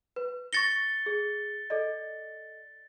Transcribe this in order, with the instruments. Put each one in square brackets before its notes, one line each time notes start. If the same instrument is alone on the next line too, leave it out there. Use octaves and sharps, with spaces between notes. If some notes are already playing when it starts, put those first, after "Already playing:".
[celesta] B4
[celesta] C#6 A#6 [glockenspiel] A6 C#7 G7
[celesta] G#4
A4 D5 D#5